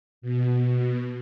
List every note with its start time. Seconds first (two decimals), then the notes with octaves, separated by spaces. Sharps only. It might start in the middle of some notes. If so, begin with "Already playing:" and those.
0.22 B2